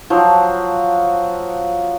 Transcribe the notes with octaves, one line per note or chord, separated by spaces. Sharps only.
F3 F#3